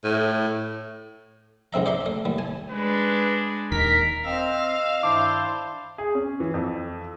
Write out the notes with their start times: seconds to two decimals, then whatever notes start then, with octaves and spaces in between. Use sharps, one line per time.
0.04 A2
1.73 C#2 G#2 C4 E5 A#5
1.86 C5 D5 E5 A#5 C6
2.06 A3
2.25 D#2 G3
2.38 G#5 A5
2.71 G#3 D4 B4
3.72 D#1 D#2 D#3 A#4 B6
4.25 C4 D#5 F5 E6
5.03 G2 D#3 D4 E4 C5 A5 D6
5.98 G#4
6.15 C#4
6.40 E3
6.54 F2